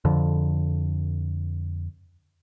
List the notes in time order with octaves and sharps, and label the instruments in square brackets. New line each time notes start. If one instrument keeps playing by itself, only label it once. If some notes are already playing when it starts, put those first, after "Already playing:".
[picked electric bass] F2 D3